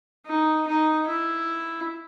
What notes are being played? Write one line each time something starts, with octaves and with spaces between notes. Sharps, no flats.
D#4
D#4
E4